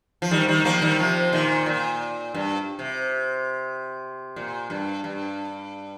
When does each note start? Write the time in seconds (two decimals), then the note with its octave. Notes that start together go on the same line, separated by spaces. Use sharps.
0.22 F3
0.31 D#3 G3
0.48 D#3 G3
0.65 F3 A#3
0.82 D#3 G3
0.99 C3 F3
1.33 A#2 D#3
1.66 A#2
2.34 G2
2.79 C3
4.36 A#2
4.70 G2
5.04 G2